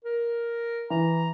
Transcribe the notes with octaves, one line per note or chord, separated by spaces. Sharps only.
A#4
E3 A#5